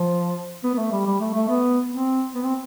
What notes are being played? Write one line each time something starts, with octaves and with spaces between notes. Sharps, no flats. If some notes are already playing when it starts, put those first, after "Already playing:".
Already playing: F3
B3
B3
A3
G3
G3
A3
A3
B3
C4
B3
C4